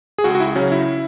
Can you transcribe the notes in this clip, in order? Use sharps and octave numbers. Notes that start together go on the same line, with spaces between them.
G#4
C#2 F#4
F#4
E4
C#3 F#3 C#4
E4